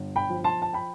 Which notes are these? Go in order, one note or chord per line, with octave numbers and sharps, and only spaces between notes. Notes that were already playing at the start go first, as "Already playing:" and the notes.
Already playing: G1
G5 B5
F3
A5 C6
A5
G5 B5